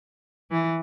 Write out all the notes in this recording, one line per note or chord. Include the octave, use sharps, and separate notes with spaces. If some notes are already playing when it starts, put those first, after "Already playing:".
E3